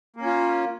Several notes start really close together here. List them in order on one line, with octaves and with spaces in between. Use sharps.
A#3 C#4 F4